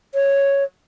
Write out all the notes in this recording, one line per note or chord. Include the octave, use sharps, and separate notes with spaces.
C#5